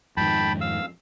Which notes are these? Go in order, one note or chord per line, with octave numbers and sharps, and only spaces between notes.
F2 G#2 D#3 G5 A5 B5
F5 E6